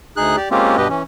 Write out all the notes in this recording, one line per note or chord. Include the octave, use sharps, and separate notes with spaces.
D2 D#4 G#4 F#6
G4 D5
G#3 A#3 C4 C#4 F4 G4
G2 B2 G4 B4 D#5
E3 C#4